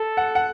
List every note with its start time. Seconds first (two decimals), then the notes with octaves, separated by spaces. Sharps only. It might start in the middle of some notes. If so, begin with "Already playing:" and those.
Already playing: A4
0.17 F#5
0.35 F#5